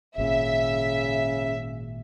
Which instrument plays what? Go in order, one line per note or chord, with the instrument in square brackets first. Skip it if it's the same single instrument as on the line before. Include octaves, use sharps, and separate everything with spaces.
[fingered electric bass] G#1 A#2 [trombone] C#3 [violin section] E5